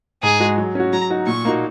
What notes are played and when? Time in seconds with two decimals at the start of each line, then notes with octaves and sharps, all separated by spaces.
0.23 G#2 G#4
0.40 G#3 F#4
0.58 F#3
0.75 C#4 F#4
0.93 F#3 A#5
1.10 D#4 F#4
1.27 A#2 C#6
1.45 A#3 D#4 F#4